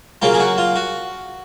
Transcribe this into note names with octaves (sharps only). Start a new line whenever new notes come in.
C#3 F#3 A#3 F4
G#4
F#4
F4
F#4